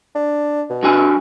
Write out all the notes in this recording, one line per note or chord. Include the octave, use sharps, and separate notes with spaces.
D4
B2
G2 F#4 G#5